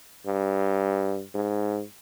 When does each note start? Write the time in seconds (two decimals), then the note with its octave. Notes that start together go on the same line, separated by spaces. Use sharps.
0.27 G2
1.35 G#2